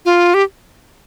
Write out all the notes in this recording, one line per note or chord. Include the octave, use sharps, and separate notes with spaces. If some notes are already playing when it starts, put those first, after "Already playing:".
F4
G4